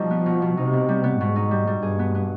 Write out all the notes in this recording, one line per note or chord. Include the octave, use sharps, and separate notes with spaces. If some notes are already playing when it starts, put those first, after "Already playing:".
Already playing: B2 F3 G3 D#4
B3
B2
B2
C3 D#4
B2
G3
B3
G#2 B2
D#4
G3
G3
G2 G#4
B3
B3